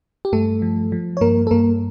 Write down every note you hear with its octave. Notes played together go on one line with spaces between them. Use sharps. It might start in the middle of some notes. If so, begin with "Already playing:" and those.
G4
G2 A3 A4
F3
F3
C#5
G2 A#3 A#4
A4
G2 A#3 A#4